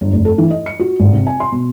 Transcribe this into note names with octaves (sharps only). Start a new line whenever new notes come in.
G1
F1
A4
E3
D#5
C#7
F#4
G#1
C3
G#5
C6
B2